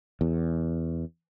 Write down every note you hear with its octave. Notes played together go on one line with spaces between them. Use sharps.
E2